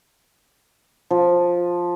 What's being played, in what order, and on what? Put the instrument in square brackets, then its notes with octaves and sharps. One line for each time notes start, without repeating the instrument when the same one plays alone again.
[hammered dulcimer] F3